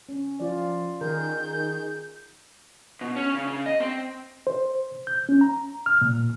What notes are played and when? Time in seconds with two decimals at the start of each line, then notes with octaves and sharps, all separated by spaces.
0.09 C#4
0.40 F3 F4 D5
1.01 D#3 G#4 A#4 G6
3.01 B2
3.16 C#4
3.34 C#3
3.47 C#3
3.66 D#5
3.80 C4
4.47 C5
5.07 G6
5.29 C#4
5.41 A#5
5.86 F6
6.01 A#2